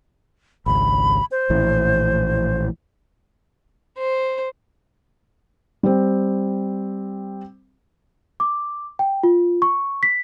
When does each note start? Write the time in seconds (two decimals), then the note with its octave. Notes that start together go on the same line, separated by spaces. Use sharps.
0.66 G#1 C#2 B5
1.31 C5
1.50 A#1 A2 E3
3.98 C5
5.83 G3 C4
8.40 D6
8.99 G5
9.23 F4
9.62 C#6
10.03 B6